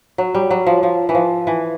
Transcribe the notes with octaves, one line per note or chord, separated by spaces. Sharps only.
F#3
G3
F#3
F3
F3
E3
F3
E3